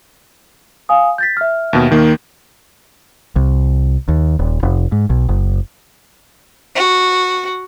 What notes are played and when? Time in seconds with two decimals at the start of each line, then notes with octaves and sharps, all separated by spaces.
0.89 F5 G#5 D#6
1.18 G6 A6 B6
1.37 E5 F6
1.73 D#2 B2
1.91 D#2 D#3 A#3
3.36 C2
4.08 D#2
4.39 D#1
4.63 F1
4.92 G#2
5.10 B1
5.29 F#1
6.75 F#4